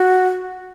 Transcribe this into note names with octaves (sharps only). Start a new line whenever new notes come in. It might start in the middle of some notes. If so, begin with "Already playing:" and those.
Already playing: F#4